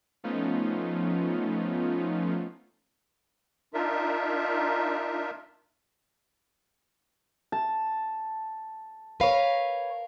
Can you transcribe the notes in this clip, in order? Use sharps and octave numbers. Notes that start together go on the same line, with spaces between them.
F3 A3 B3 C#4 D#4 F4
D4 D#4 F4 A#4 E5
A5
A#4 B4 C#5 F5